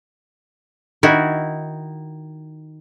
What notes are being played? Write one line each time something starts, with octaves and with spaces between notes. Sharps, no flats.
D#3 E4 F#4